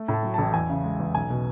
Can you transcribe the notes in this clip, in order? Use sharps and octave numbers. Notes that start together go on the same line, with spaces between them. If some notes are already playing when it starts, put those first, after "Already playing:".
Already playing: A3
A2
A5
F#3
A5
A1
E2 G#5
C#3
G#3
E2
B1 G#5
B2